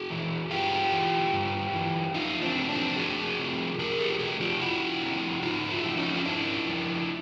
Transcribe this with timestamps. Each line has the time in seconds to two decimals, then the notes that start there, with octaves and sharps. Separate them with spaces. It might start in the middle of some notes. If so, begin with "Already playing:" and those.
Already playing: F#4 G#4
0.10 E3
0.51 G2 F4 G4
0.92 E3
1.33 G2
1.73 E3
2.14 F2 D#4 F4
2.42 C4 D4
2.55 C3 F3
2.69 C4 D4
2.96 F2 F#4 G#4
3.38 C3 F3
3.78 F2 G#4 A#4
3.99 G4 A4
4.19 C3 F3 F#4 G#4
4.41 F4 G4
4.60 F2 E4 F#4
5.02 C3 F3
5.43 G#2 D#4 F4
5.70 E4 F#4
5.84 F3
5.97 C#4 D#4
6.14 F4
6.25 G#2 D4 E4
6.65 F3